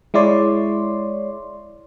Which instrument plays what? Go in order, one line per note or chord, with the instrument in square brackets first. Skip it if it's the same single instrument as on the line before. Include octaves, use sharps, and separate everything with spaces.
[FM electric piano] G#3 E4 C#5 D5 C6